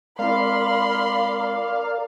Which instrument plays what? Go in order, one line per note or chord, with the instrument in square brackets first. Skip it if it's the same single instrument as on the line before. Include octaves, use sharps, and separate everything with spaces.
[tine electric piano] G#3 C4 E4 [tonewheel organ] A#4 D5 [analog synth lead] F5 [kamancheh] B5 C6